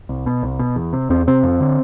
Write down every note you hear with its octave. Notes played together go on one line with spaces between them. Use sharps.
C2
B2
C2
B2
E2
C3
E2 C4
C3 C4
F2
D3